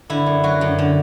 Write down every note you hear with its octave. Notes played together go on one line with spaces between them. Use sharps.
D3 E4
F#2
F#3 F#4
F#2
D3